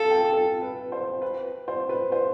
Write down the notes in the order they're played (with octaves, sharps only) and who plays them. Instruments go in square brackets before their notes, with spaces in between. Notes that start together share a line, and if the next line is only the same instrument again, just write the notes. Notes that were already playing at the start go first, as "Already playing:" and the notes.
Already playing: [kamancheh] A4 [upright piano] F5
[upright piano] G5
A4
B4
C5
B4
C5
B4
C5